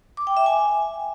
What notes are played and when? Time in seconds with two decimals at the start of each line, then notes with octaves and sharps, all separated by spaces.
0.17 D6
0.27 G5
0.37 E5
0.46 G#5